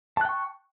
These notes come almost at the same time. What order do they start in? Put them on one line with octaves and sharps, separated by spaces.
A5 F#6 G5 C#6